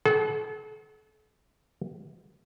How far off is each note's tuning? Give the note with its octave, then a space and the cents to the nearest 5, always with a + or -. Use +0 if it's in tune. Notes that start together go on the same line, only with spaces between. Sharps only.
A4 -40 F#5 +10